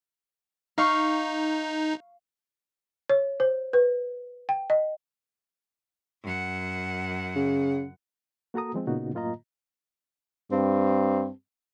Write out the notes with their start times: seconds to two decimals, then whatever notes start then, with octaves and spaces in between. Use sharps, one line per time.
0.78 D#4 F5 C#6
3.09 C#5
3.40 C5
3.73 B4
4.49 G5
4.70 D#5
6.24 F#2 F#5
7.35 C#3
8.54 A#3 F#4 A4 A#5 D#6
8.74 F3 G#3 C4
8.87 A#2 C#3 B3 D#4 F#4
9.13 F#2 A2 A#3 F4 D#5 A#5
10.52 G2 C4